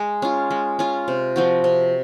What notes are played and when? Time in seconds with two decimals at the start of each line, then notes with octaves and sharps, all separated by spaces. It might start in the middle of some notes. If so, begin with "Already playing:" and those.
Already playing: G#3
0.22 C#4 F4
0.51 G#3
0.79 C#4 F4
1.08 C3
1.36 F3 C4 F#4
1.64 C3